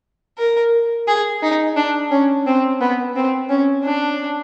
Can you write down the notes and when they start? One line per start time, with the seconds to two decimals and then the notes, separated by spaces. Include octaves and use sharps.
0.38 A#4
1.07 G#4
1.42 D#4
1.76 D4
2.11 C#4
2.46 C4
2.81 B3
3.15 C4
3.49 C#4
3.83 D4